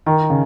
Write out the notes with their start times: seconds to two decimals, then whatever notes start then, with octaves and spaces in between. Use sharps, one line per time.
0.06 D#3
0.30 C#3